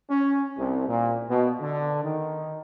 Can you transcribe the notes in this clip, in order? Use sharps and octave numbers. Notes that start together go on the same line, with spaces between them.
C#4
C2
A#2
B2
D3
D#3